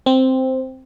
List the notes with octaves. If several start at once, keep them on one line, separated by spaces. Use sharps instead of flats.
C4